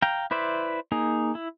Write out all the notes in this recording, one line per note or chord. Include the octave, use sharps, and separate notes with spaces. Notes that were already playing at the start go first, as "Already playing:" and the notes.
F5 G5 A#5
E4 B4 C5 D5 E5
A#3 D#4 G#4
E4